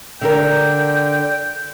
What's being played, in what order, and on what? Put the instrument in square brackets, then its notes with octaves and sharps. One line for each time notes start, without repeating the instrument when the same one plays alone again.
[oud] D3 D4 A#4 [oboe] G5